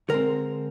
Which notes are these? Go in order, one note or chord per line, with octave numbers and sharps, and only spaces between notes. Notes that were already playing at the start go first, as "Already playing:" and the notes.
D3 G#3 C4 A#4